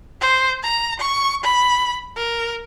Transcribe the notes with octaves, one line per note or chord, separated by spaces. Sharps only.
C5
A#5
C#6
B5
A#4